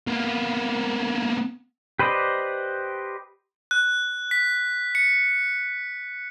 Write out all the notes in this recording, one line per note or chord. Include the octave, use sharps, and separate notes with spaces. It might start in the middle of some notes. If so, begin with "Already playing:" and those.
A#3 B3
G4 B4 C5 D5 D#5
F#6
B6
C#7